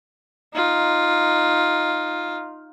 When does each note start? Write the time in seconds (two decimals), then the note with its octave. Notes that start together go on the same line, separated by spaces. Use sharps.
0.54 D#4 F4